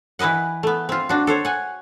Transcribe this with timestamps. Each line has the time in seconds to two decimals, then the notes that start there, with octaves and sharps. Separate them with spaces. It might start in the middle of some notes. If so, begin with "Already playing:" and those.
0.19 E3 E4 B4 D#5 F#5
0.63 A3 B3
0.89 C4 F4
1.09 D4 F#4
1.27 A4 C5 C#5
1.45 F#5 G#5